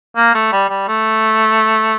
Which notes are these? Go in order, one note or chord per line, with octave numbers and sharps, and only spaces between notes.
A#3
A3
G3
G3
A3